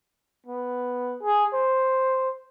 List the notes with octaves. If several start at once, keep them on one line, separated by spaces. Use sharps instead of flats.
B3
G#4
C5